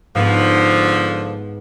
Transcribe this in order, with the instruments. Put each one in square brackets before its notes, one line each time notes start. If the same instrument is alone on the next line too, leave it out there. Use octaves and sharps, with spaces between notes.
[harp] G#2 B3 [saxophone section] D3 F3